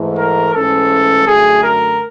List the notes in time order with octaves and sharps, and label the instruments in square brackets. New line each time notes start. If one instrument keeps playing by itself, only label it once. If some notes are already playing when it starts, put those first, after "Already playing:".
Already playing: [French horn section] G#2 E3 A3
[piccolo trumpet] A#4
[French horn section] G#2 E3 A3 C#4 [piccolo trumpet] A4
[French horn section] F#2 D3 F#3 A3 [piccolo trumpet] G#4
[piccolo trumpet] A#4